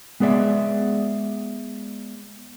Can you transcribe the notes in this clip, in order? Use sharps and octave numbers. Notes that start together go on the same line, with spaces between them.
G#3 B3 G#4 D5 E5